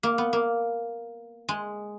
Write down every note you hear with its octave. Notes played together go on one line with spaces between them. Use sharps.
A#3
B3
A#3
G#3